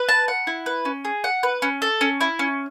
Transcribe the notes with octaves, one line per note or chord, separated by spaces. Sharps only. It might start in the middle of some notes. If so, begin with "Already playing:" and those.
Already playing: B4
A5
F#5
E4
B4
C#4
G#4
F#5
B4
C#4
A4
C#4
E4
C#4